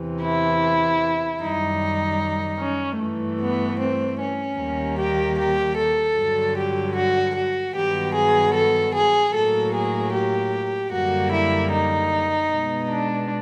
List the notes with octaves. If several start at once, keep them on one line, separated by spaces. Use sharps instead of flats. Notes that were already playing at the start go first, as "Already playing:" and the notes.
Already playing: E2 C3 E3
E4
F#2 D#3 G3 D#4
C#4
G2 E3 A3
B3
C4
C#4
D#2 D#3 G3 A#3
G4
G4
A4
G2 D3 F#3
G4
F#4
F#4
G2 D#3 F#3 B3 G4
G#4
A4
G#4
A2 F#3 A#3 A4
G#4
G4
F#2 D3 G3 A#3 F#4
E4
D#4
B2 G#3 B3
D4